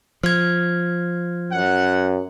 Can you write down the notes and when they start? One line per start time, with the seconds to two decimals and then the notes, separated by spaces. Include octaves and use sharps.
0.23 F3 F6 G#6
1.52 F#2 F#5